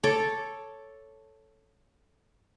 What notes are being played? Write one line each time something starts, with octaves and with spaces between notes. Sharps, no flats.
A4 C#5 D6